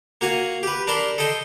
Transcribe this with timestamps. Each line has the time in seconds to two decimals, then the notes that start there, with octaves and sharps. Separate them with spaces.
0.21 A#3 F#4 F5 G#5
0.63 G4 B4
0.87 D4 A#4 A5 B5 C6
1.18 A4 D#5 G5 A5 C6